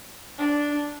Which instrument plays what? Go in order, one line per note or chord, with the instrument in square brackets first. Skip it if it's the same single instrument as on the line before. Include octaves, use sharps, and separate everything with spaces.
[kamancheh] D4